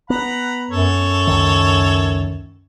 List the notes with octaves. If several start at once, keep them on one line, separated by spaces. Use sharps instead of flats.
B3 F#5 A#5 B5
F#2 A4 C#5
C#2 D#3